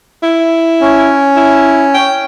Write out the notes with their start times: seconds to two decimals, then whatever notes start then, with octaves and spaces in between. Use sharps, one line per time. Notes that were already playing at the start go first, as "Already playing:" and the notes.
0.23 E4
0.81 C#4
1.36 E4
1.94 G5